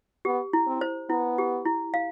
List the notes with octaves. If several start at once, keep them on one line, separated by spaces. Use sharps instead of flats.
B3 G4
E4
C4
C5
B3 E4
G4
E4
F5